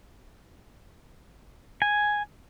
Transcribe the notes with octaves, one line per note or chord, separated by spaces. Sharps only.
G#5